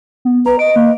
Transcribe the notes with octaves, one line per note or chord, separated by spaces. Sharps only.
B3
B4 A#5
D#5 D7
A#3